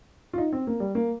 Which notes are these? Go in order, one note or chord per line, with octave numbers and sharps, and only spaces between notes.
F4
D#4
C4
A#3
G3
A#3